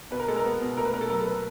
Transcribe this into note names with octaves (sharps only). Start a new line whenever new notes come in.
B2 B4
A#4
G#3 A4
A#4
B3
B2
A3 A#4
B4
B2 A#4
A4
F#3 A#4
A4
B4
A#4